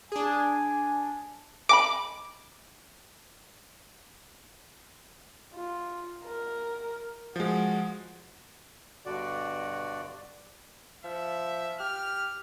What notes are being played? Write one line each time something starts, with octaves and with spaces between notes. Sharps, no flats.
D4 G#4 G#5
D#5 G#5 B5 D6
F4
A#4
F3 G#3 F#4
G2 B2 D3 F#4 D5
F3 E5
G4 F6